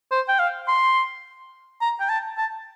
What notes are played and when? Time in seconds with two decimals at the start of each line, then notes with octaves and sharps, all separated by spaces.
0.12 C5
0.29 G5
0.39 F5
0.68 C6
1.81 A#5
2.00 G5
2.09 A5
2.37 A5